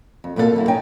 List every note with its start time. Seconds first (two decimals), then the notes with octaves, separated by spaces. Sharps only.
0.24 F2
0.36 F2 B2 A#3 D4 A4 F5
0.56 F#2 A#3 E4
0.68 C#4 D#4 G5